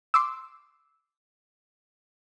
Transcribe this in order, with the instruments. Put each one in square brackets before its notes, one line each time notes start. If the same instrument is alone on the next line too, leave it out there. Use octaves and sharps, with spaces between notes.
[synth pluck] C6 D6 E6